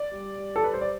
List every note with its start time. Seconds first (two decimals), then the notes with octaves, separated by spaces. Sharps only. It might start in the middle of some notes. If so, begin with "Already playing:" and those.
Already playing: D5
0.11 G3
0.38 G3
0.56 A4
0.64 G3 B4
0.74 C5
0.81 D5